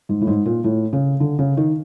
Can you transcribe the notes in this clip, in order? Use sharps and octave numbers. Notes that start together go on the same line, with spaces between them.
G#2
A2
G#2
A#2
A2
C#3
D3
C#3
D#3